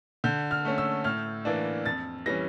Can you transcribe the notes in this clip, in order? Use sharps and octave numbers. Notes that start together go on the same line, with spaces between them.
D3 G6
F6
A3 C#4
E6
A2 F6
E3 A#3 D4
F2 A6
E3 G3 C#4 A#6